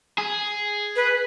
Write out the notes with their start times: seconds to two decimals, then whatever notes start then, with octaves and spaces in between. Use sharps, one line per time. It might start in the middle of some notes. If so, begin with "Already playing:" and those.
0.18 G#4
0.96 B4